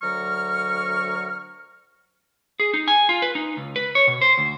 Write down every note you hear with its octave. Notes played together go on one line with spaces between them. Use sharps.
D2 D3 F#3 A#4 C#6 F6
G#4
D#4
G#5
F4
B4
D#4
C#2
B4
C#5
B2
C5
D2